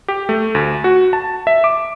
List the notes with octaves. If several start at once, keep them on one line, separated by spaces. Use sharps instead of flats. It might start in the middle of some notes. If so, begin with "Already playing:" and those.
G4
A3
D2
F#4
A5
E5
D6